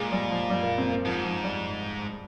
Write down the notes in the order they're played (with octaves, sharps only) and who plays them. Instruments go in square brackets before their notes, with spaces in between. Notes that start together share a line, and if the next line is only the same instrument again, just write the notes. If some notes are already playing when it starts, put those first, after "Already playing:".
Already playing: [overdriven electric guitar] A#2 [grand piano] G#3
[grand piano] G3
F3
G3
A#3
C4
A#3
[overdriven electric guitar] G#2 [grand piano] F3
[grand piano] F3
G3